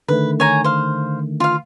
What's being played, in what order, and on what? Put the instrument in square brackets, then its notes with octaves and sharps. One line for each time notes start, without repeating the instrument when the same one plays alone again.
[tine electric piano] D3 D#3 A3 [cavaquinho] B4
[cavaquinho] C#5 G#5 A#5
C5 F5
F4 F5